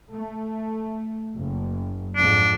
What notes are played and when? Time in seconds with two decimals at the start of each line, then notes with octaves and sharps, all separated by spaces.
0.14 A3
1.36 F#1
2.16 F2 G#2 D4